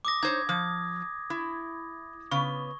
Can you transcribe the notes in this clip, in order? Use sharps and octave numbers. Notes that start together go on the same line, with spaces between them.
D6 D#6 A#6
D#4 C5 C#5 G#6
F3 D#6
E4
C#3 B3 C#6